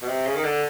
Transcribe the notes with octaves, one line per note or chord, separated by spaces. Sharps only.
B2
C3
C#3
D#3
D3